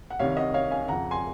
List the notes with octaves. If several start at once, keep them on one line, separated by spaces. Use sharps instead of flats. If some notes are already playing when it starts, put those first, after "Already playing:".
F#5
C2 C3 D#3 C#5 F5
D#5 F#5
C#5 F5
F5 G#5
F2 C#3 F#5 A#5
G#5 C6